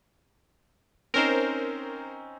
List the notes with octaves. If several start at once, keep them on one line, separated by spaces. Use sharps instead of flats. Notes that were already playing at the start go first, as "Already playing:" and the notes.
C4 C#4 D#4 A#4 C5